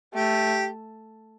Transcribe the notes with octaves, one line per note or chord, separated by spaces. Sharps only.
A3 G4